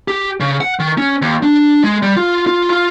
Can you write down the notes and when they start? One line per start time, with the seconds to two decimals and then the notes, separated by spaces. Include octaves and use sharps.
0.08 G4
0.40 C#3
0.61 F#5
0.79 D#3
0.98 C#4
1.22 D#2
1.43 D4
1.84 G#3
2.02 G3
2.16 F4
2.47 F4
2.70 F4